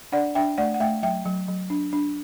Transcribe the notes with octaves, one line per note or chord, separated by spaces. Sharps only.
D4 D5 F#5
D4 E5 G5
A3 D5 F#5
F#5
A3 E5 G5
F#3 E5 G5
F#3
F#3
D4
D4